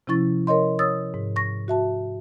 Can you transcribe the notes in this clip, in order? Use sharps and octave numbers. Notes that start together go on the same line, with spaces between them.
C3 F3 C#4 E4 C#6 A6
A#4 C#5 D#5 C6
C#5 D#6 E6 A6
G#2
C#6 A#6
F#4 E5 A5